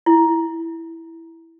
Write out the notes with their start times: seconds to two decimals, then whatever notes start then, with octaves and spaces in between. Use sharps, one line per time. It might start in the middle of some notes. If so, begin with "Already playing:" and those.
0.06 E4